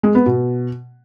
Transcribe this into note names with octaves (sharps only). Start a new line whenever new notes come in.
G#3
B3
B2